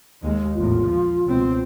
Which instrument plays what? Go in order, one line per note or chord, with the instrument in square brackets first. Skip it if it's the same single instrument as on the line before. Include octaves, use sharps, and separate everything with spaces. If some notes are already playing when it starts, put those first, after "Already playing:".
[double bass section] D#2 G#3
[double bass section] A#1 E2 A2 [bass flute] F4
[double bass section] F3
C#2 B2 C4